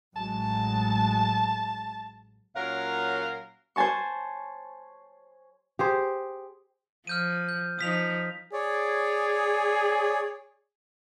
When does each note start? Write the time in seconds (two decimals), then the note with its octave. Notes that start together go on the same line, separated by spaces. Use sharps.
0.16 A1 F#3 G#3 A5
2.56 A#2 F#3 C#4 A#4 F5 F#5
3.76 C5 C#5 G#5 A5 C#6
5.79 G4 G#4 C5
7.07 F3 F6 G6 D#7
7.49 G6
7.79 F3 D#4 D#6 B6 F7
8.53 G#4 C#5 D5